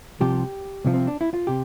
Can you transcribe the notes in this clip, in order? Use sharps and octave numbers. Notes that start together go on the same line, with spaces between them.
C2 C3 F3 G4
C2 C3 F3
C4
D4
E4
F4
C3 G4